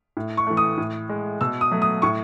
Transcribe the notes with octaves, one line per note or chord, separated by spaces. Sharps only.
A2
C#6
E3 A3
D#6
A2
G#3
B2 E6
D#6
F#3 A3
D#6
A2 C#6